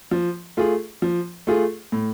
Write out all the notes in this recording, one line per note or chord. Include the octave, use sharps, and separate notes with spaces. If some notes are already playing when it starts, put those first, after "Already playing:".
F3
A3 F4 G#4
F3
A3 F4 G#4
A2